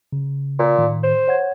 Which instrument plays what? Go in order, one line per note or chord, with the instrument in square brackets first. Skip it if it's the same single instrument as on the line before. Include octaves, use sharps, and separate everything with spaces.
[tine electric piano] C#3
[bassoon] A#2
[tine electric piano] A2 D#3
[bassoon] C5
[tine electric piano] C#5 F#5 G#6